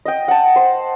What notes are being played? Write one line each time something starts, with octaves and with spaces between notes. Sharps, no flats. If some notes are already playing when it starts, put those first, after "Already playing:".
D#5 G5
F#5 A5
C5